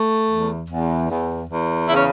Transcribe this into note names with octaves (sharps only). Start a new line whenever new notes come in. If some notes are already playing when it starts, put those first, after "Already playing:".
Already playing: A3
E2
E2
E2
E2
C#3 E4
C#4